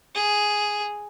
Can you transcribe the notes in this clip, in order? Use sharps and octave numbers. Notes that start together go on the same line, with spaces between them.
G#4